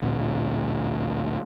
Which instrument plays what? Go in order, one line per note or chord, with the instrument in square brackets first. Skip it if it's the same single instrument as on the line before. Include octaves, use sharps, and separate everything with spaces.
[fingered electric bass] A1 D2 A#2 C4